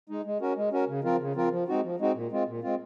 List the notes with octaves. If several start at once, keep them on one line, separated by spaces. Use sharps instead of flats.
G#3 D#4
G#3
C#4 F#4 A#4
G#3
C#4 F#4 A#4
C#3
F3 C4 F4 A#4
C#3
F3 C4 F4 A#4
F3
G#3 C4 D#4 F#4
F3
G#3 C4 D#4 F#4
A#2
G#3 C4 F4
A#2
G#3 C4 F4